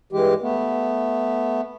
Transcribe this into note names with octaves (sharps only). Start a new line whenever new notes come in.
G2 E3 G#3 G4
A3 B3